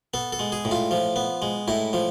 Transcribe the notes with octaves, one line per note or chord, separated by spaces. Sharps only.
B3 A4
A4
G#3
G#4
A2
F4
F3
B3
G#3
A2 E4
F3